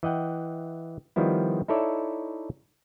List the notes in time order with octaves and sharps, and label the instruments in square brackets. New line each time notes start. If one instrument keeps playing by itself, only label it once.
[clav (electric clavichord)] E3 D#5 F#5 G5
D#3 F3 G3 B3 E4
D#4 E4 A4 C#5 D5 E5